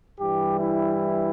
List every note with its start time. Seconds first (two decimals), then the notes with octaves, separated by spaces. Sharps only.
0.20 G2 E3 G3 G4
0.60 E4